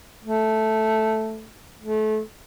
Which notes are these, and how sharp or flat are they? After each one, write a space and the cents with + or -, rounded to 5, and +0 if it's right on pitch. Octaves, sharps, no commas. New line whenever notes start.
A3 -5
A3 -30